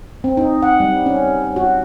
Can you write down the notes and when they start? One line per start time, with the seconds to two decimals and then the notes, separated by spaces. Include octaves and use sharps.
0.24 C4
0.37 D#4
0.63 F#5
0.80 G3
1.06 C#4
1.56 F#4